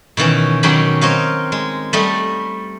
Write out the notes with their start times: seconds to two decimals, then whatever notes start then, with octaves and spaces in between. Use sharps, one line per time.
0.17 B2 D#3 E3 C#4
0.63 B2 D#3 F#3 C#4 G4 B5
1.01 C4 D#4 C#5 D#5 F5
1.52 G#3
1.93 G3 A3 D#5